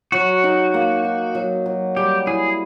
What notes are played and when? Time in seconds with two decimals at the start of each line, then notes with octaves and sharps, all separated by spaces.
0.12 F#3 F#4
0.44 D#4
0.74 A#3
1.05 D#4
1.35 F#3
1.66 F#3
1.96 G3 G4
2.27 E4 G#4